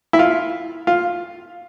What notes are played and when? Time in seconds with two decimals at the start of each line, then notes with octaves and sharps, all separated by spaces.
0.13 E4
0.19 F4
0.87 F4